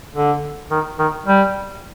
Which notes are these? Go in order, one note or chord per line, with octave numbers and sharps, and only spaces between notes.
D3
D#3
D#3
G3